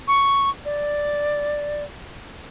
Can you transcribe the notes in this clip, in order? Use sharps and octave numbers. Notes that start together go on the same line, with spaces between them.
C#6
D5